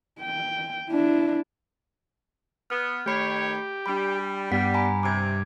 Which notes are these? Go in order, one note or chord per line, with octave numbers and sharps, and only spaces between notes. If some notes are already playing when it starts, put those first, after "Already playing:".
G5
D4 E4
B3 F6
D#3 A3 G4 C#5 B5 C7
G3 D4 B5
G2 G3 B3 F#5 B6
G#5 A#5 B5
C3 D6 G#6